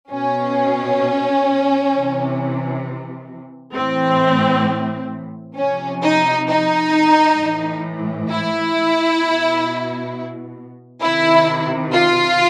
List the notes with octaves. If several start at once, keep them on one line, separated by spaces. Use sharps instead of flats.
B2 C#4
C3 E3
A2 E3 C4
C3 F3 C#4
D#4
D#4
A2 E3
E4
B2
C3 D#3 E4
F4